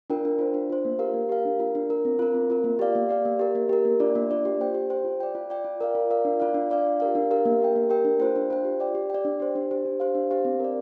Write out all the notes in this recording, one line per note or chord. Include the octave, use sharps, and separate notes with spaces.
D4 F4 A#4 G5
D4
F4 C5
D4
F4 C5
A#3
G4 A#4 F5
A#3
G4 A#4 F5
D4
F4 A#4
D4
F4 A#4
C4
F4 A#4
C4
F4 A#4
A#3
G4 D5 F5
A#3
G4 D5 F5
A#3
G4 A#4
A#3
G4 A#4
A#3
D4 F4 D5
A#3
D4 F4 D5
G4
C5 G5
G4
C5 G5
F4
D5 G5
F4
D5 G5
F4
A#4 D5 F5
F4
A#4 D5 F5
D4
F4 D5 F5
D4
F4 D5 F5
D4
G4 A#4 F5
D4
G4 A#4 F5
A#3
G4 A#4 G5
A#3
G4 A#4 G5
D4
F4 C5 G5
D4
F4 C5 G5
G4
D5 G5
G4
D5 G5
D4
G4 C5
D4
G4 C5
D4
G4 C5 F5
D4
G4 C5 F5
C4
A#4 D5